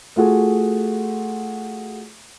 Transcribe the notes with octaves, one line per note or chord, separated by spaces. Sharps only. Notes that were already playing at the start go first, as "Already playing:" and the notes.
A3 F4 F#4 G#4